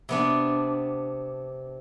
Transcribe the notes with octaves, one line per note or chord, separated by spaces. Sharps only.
C3 B3 D4